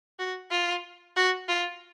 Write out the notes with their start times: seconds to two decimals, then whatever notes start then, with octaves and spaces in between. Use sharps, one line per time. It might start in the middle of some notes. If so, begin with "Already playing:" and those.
0.19 F#4
0.51 F4
1.16 F#4
1.48 F4